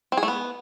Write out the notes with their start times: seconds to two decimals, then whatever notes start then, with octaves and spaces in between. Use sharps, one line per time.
0.12 C4
0.17 G#4
0.23 A3
0.28 B3